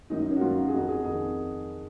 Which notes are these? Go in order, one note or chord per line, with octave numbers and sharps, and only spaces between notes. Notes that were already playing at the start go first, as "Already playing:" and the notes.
F#2 D#3 D#4
D#4
C#4
F#4
F#2 D#3 F4
G#4
F2 D#3 F#4
G#4
F2 D#3 G#4